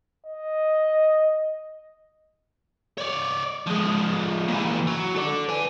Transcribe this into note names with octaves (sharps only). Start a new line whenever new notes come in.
D#5
C#5 D5
F3 G#3
A#2 E3
F#3
A4 D5
B4 G#5